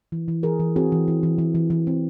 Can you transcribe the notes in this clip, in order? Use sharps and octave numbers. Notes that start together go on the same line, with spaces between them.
E3
E3
E3 G#4 A#4
E3
C4 F#4 G#4
E3
E3
E3
E3
E3
E3
C4